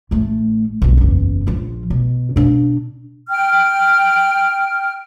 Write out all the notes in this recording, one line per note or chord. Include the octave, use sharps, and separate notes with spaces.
A1 A3
B1 G2
F#1 E2
A#1 F3
B2
B2 D4
G5 F6